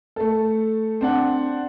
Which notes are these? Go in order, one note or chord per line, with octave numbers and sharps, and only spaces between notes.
A3 A4
C4 D4 F#5